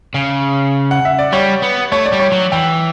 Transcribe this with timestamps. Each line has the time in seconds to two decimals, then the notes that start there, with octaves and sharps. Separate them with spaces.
0.14 C#3
0.91 F#5
1.05 E5
1.19 D5
1.33 G3 C#5
1.63 B3
1.92 A3 C#5
2.06 D5
2.12 G3
2.19 C#5
2.32 F#3
2.52 E3 G5